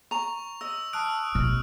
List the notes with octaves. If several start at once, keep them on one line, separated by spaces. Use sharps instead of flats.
A#5 C#6 F7
D#5 E6
A5 D#6 F6 F#6 D7
A1 B2 F6